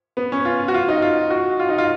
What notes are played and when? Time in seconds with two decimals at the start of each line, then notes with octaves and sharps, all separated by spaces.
0.17 B3
0.32 C#4
0.45 F4
0.68 F#4
0.74 F4
0.88 D#4
1.02 F4
1.30 F#4
1.59 F4
1.69 D#4
1.78 F4